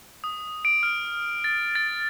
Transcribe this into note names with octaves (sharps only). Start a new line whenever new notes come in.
D#6
D7
F6
A6
A6